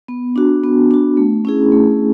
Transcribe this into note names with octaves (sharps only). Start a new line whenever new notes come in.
B3
D4 F#4
B3
D4 F#4
A3
C#4 E4 G#4
A3